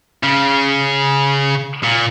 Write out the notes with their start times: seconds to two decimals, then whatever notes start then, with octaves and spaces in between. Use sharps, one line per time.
0.23 C#3
1.84 A#2